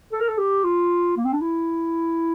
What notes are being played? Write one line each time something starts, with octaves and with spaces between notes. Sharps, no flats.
A4
A#4
A4
G4
F4
A#3
C4
D4
E4